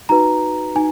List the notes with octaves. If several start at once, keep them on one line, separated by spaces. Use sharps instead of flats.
D#4 F#4 B4 A#5
D#4 G#5